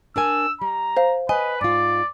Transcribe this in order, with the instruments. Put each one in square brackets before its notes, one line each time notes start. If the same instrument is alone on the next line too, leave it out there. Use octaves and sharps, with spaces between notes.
[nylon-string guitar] D4 A#4 G#5 [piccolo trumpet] E6
[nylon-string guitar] G3 [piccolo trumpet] A#5
[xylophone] C5 F5
[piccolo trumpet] B4 [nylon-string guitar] D#5 [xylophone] G#5
[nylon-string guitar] G#2 F4 [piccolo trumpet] D5